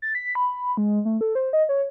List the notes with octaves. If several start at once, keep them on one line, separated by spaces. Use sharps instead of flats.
A6
B6
B5
G#3
A3
A4
C5
D#5
C#5